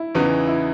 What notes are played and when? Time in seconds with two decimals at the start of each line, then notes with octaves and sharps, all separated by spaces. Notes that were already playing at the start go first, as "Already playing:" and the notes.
Already playing: E4
0.15 E2 C#3 E3 B3 D#4
0.48 E4